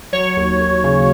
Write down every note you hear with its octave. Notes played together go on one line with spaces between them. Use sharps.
F#3 C#5
D#2
D#2
C#3